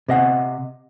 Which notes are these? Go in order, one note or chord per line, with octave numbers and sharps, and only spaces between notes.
C3 D#5 F#5